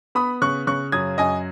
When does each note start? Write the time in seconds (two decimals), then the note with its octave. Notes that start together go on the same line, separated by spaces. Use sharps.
0.15 B3 B5 D#6
0.42 C#3 C#6 F#6
0.67 C#3 C#6 F#6
0.92 F#2 D#6 G#6
1.18 F#2 D#5 G#5